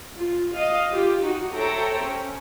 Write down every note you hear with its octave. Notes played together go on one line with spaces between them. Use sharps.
F4
D#5 F5
F4 G4
D#4 F#4
A4 C5 C#5 E5 G5 A#5
C#4